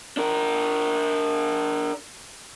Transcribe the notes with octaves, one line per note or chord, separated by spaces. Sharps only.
D4 A#4